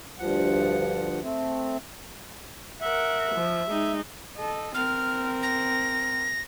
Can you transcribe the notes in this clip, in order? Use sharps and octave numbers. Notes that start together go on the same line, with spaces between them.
D2 G2 F3 F#5
A3 C4
A#4 E5 F#5
F3
G#3 D#4
A4 D#5
C4 A#4 F6
A#6